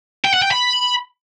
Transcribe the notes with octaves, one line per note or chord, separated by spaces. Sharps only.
G5
F#5
G5
B5